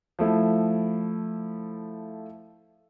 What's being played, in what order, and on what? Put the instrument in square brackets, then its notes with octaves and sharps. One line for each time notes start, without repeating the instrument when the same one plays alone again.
[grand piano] F3 A3 E4